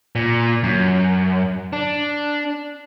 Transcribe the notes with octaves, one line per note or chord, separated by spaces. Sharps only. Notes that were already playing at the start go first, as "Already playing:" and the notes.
A#2
F#2
D4